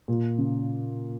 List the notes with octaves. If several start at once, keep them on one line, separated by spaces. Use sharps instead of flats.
A#2
C#3